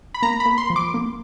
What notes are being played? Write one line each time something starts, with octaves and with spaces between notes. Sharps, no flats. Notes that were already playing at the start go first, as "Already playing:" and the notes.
B5
A#3 A#5
B5
A#3
C6
F3
D6
A#3